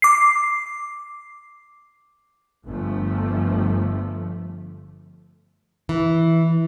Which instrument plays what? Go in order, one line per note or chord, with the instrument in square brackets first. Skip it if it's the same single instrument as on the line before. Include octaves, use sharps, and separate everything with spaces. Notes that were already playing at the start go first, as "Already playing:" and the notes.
[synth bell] D6 C7
[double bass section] G1 F3 A3
[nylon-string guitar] E3